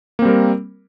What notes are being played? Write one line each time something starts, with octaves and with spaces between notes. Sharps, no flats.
G3 A#3 C4 A#4